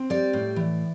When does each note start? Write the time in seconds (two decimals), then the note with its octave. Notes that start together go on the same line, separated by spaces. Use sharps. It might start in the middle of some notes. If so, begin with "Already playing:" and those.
Already playing: C4
0.10 G3 D5
0.33 A2
0.56 E3